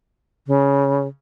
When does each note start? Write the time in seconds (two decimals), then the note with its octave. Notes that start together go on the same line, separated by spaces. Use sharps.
0.47 C#3